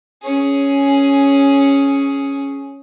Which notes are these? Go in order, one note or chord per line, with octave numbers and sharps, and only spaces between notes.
C#4 G#4